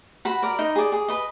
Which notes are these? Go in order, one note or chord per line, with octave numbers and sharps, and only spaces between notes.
F#4 B5
A#4 D5
D#4
G#4 D5
G#4
B4 D#5